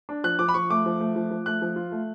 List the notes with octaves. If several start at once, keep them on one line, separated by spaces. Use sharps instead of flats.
D4
F3 F#6
F3 D6
B5
F3 C#6
A3 D6
F3
A3
F3
F3
A3 F#6
F3
F4
A3